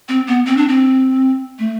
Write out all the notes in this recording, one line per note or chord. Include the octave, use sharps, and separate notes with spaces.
C4
B3
C4
D4
C4
A3